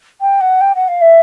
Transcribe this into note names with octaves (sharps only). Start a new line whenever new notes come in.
G5
F#5
G5
F#5
F5
E5